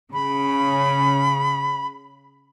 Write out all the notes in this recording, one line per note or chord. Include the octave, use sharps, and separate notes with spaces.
C#3 B5